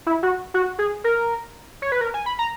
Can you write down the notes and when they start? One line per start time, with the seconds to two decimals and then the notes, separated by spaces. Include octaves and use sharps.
0.06 E4
0.23 F#4
0.54 F#4
0.79 G#4
1.04 A#4
1.82 C#5
1.92 B4
2.01 A#4
2.14 G#5
2.26 B5
2.39 A#5